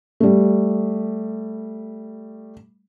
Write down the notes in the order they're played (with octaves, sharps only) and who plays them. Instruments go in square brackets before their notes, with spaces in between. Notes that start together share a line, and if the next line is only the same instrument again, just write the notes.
[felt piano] G3 A3